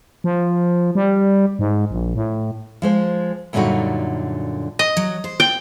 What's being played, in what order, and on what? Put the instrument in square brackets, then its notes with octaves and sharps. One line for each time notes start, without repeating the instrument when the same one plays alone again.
[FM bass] F3
G3
G#2
A#1
A2
[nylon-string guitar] F3 G#3 C5
F#2 A#2 D3 G3 D#4 F#4
[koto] D#5
[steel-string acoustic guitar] F#3
C5
[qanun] G5